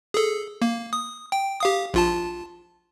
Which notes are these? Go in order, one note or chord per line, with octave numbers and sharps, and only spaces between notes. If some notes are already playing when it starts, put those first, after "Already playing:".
G#4 A4
A#3
D#6
G5
G4 F5 D#6
A#1 F4 A5